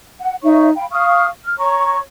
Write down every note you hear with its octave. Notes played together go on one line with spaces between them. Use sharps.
F#5
D#4 C#5 E5 C#6
F5 G5 B5
F5 C#6 D#6 F6
F6
C#5 A#5 C#6